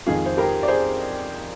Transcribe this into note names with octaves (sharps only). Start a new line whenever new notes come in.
F2 D#3 G#3 F4 G#4
C5
G4 A#4
D5
G#4 C5